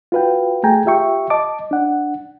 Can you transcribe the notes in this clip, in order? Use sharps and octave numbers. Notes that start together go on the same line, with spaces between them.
F4 F#4 B4 F5 G5
A3 G#4 G5 G#5 A#5
F4 G4 E5 G5 C#6
D#5 A5 D6
D4 F#5